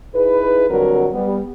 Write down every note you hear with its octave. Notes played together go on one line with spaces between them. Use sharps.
D#4 E4 G#4 B4
F2 D3 F#3 G3 C4 A#4
G3 B3